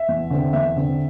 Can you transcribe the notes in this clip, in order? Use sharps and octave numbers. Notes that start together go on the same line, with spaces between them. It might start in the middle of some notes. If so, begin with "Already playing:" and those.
Already playing: E5
E2
D3 C4
E2 E5
D3 C4